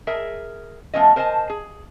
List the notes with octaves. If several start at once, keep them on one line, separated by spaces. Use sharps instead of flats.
G#4 A#4 E5
F3 A3 B3 C#4 D#5
A#4 C5 D#5 E5 G#5 A5
G#4